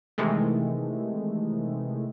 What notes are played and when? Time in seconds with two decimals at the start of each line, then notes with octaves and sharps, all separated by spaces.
0.18 C3 D#3 E3 G#3 A3